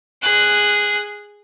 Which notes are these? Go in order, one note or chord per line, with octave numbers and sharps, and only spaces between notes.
G#4 F#6